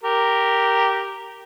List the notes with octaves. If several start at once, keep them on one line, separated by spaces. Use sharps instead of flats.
G4 A#4